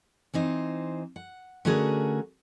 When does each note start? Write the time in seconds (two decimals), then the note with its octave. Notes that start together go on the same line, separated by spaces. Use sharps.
0.34 E3 C4 D#4 C5
1.16 F#5
1.65 D3 A3 C#4 F#4 G#4 A#4